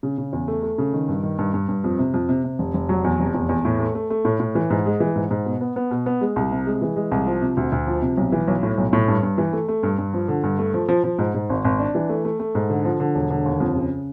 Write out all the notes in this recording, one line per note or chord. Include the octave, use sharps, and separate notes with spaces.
C#3
C#3
E2
A3
A3
C#3
D#3
G2
D#3
G2
G2
G2
F2
C3
F2
C3
C3
F1
F1
F#3
E2
F1
E2
E2
A2
A3
A3
A3
A2
A2
E3
G#2
G#3
E3
G#2
G#2
B2
B3
B3
B2
B3
G#3
C2
C3
G#3
E3
G#3
C2
F3
C3
D2
D2
F3
C3
B1
E3
B1
A2
B1
A2
G2
G2
E3
A3
A3
G2
G2
F3
D3
G2
A3
F3
F3
F3
G#2
G#2
G#1
G#1
D4
E3
A3
A3
A3
G#2
D3
F3
D3
E1
D3
D#2
F2
C#3